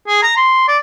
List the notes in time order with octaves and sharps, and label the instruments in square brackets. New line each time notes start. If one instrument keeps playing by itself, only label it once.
[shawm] G#4
A#5
C6
D5